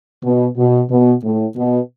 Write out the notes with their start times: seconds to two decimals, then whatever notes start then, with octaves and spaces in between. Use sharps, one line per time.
0.24 B2
0.57 B2
0.91 B2
1.24 A2
1.57 B2